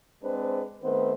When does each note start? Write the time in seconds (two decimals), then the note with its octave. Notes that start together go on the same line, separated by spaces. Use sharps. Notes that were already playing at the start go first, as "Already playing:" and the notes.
0.23 G#3 C4 D4 B4 C5
0.83 D#3 A3 B3 C4 B4 C5